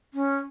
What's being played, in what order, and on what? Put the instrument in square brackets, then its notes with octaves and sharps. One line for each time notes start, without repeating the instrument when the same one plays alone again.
[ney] C#4